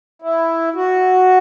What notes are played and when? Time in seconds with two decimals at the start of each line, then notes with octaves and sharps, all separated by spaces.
0.22 E4
0.75 F#4